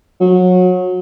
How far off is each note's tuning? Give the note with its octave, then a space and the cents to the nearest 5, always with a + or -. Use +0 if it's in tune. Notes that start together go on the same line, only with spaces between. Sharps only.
F#3 -25